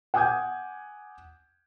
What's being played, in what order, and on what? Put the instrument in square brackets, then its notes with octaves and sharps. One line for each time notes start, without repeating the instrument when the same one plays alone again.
[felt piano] F#5 G#5 D6 D#6 G6 G#6